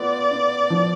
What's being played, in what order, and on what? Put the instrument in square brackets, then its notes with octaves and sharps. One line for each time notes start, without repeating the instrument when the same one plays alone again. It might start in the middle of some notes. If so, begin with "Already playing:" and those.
Already playing: [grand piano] B3 F4 [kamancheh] D5
[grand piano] B3
F3